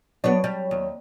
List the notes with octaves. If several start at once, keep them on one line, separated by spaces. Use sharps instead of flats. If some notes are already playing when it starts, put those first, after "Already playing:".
F#3 B3 D4 C#5
G3
D#2